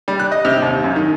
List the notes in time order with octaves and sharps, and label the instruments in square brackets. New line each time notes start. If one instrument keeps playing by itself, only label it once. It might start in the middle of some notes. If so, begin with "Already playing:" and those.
[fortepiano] G3
F#6
D#5
C3
D#2
F#2
D#3